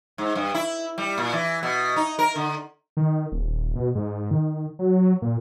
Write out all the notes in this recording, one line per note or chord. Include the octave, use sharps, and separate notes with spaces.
G#2
G2
E4
G3
A#2
E3
B2
D#4
A#4
D3
D#3
D#1
B2
G#2
D#3
F#3
A#2